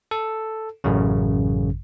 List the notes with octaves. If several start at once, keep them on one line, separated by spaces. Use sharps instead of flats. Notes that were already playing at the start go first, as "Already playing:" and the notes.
A4
A1 F#2 C#3